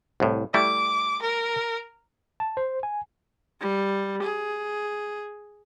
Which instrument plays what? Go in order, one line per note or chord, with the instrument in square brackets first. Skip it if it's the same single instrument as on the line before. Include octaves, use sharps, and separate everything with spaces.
[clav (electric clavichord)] C2 A2
[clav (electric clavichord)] G3 A3 E4 [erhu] D6
[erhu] A#4
[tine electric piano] A5
C5
G#5
[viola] G3
G#4